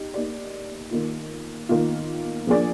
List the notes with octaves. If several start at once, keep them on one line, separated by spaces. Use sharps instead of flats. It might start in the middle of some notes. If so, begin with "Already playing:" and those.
Already playing: D#4 G4
A#3 D#4 G4 D5
D#3 A#3 F4
D#3 A#3 F4
F3 A#3 D4 G#4 D5